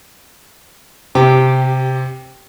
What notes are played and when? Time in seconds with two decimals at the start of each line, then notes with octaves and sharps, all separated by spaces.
1.15 C3 G4